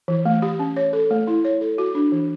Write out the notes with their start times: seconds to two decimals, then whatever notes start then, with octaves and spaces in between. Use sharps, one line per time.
0.08 E3
0.25 A3
0.42 G4
0.59 C#4
0.76 C#5
0.93 A4
1.11 A3
1.27 E4
1.45 C#5
1.61 A4
1.78 F#4
1.95 D4
2.12 E3